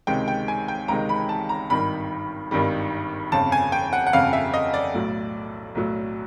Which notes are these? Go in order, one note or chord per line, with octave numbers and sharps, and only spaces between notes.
C#2 C3 D#3 G#3 G5
G5
G#5
G5
C#2 C3 D#3 G#3 A#5
B5
A5
A#5
G#1 G2 D#3 G3 B5
G#1 G2 D#3 G3
G1 F2 C#3 A5
G#5
G5
F#5
F#5
G1 F2 C#3 F5
E5
D#5
D5
B1 A2 F#3
B1 A2 F#3